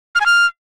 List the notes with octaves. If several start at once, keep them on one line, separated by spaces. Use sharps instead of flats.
F6
G#5
F6